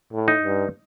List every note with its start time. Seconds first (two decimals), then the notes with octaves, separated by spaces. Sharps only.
0.13 A2
0.28 D#4
0.44 G2